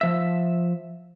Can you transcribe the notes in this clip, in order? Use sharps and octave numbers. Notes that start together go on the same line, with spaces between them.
F3 E5